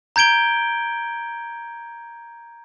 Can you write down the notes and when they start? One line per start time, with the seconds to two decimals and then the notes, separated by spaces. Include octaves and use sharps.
0.16 A#5 G6 G#6 D7 G7